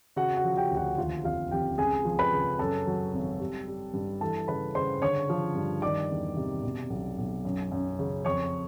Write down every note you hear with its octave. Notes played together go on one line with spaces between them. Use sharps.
C#3 F#4 F#5
F#4 F#5
F3
G4 G5
D2
F#4 F#5
D#2 F4 F5
F1 F4 F5
F1 G4 G5
C#2 G#4 G#5
F3
B4 B5
C#3
F#2 A4 A5
F#3
G#1
G3
G3
G2
E3 A4 A5
C#3 B4 B5
C#3 C5 C6
D3 C#5 C#6
F3
G2
D#3 D5 D6
E2
C3
B2
B1
B1
F#2
F#2
C#3
F2 C#5 C#6